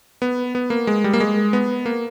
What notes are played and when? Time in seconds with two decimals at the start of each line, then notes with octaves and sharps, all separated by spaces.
0.22 B3
0.55 B3
0.70 A#3
0.87 G#3
1.04 G3
1.13 A#3
1.20 G#3
1.53 B3
1.86 A#3